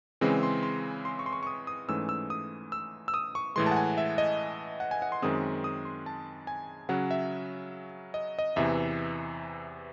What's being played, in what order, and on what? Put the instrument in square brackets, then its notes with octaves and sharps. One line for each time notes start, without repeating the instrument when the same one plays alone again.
[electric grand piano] C#3 E3 G#3 C4
C6
C6
C6
C#6
C6
C#6
C#6
D#6
D#6
G#2 E3 A3 C#4 E6
E6
D#6
E6
E6
D#6
C#6
A2 E3 G#3 C6
A5
F#5
G#5
E5
D#5
F#5
G#5
F#5
C6
F#2 D#3 G#3 C4 D#6
D#6
C6
A5
G#5
C#3 F#3 C#4 F#5
E5
D#5
D#5
E2 C3 E3 E5